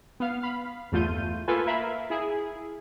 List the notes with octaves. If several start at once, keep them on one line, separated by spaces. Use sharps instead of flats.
B3 F5
F5 B5
G1 E2 A3 F4 G6 D#7
A#3 F4 A4 B4 G#5
A#4 E5 F5 B5
E4 G#4